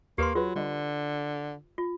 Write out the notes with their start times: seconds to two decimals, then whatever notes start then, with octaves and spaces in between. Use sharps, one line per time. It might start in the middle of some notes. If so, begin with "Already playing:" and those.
0.18 D#2 A#3 G4 B4 C6
0.35 F#3 F4 G#4 B4
0.56 D3 G3 D#5
1.78 F4